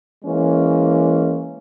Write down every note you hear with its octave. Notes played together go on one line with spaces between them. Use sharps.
E3 G#3 A#3 C#4